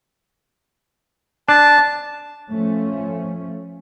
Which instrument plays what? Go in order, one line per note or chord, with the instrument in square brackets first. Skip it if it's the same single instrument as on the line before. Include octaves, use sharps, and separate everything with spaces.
[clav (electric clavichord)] D4 [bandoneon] A5
[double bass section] F3 A3 C#4